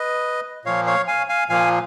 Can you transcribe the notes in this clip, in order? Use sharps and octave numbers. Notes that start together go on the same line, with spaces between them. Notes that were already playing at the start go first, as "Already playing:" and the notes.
Already playing: B4 D#5
A#2 F3 A#3 C#5 F5
C#5 F5
F5 G#5
F5 G#5
A#2 F3 A#3 F5 G#5